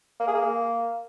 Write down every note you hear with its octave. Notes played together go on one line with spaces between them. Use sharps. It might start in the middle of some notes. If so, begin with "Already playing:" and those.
A#3
G#4
A#3